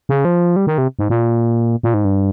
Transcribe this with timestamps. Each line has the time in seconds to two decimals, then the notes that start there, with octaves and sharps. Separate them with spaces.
0.09 C#3
0.25 F3
0.56 G3
0.67 D#3
0.78 C3
0.99 G#2
1.10 A#2
1.83 A#2
1.94 G#2
2.05 G2